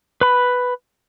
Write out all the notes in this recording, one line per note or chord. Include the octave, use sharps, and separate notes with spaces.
B4 B5